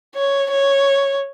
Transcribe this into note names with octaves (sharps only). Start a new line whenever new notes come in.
C#5
C#5